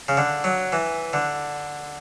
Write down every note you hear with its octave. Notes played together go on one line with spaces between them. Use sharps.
C#3
D3
F#3
E3
D3